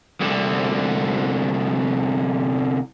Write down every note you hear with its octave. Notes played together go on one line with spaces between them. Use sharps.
C2 D3